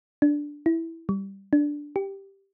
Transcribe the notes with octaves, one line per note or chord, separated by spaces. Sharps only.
D4
E4
G3
D4
G4